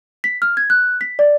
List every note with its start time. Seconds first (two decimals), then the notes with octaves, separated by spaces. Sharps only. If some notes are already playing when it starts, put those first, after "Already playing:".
0.24 B6
0.42 F6
0.57 G#6
0.70 F#6
1.01 B6
1.19 D5